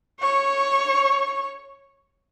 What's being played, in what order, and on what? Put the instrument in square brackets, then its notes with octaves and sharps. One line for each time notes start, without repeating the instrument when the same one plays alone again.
[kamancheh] C#5 C#6